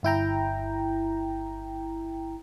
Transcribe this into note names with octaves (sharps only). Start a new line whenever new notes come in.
G1 E4 G5 A#5